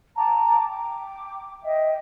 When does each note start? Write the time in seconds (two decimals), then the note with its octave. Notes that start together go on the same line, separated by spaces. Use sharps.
0.16 G5 A5 A#5 D6
0.68 G5 D6
1.63 D#5 E5 G5